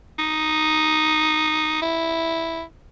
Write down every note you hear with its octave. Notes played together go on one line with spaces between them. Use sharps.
D#4
E4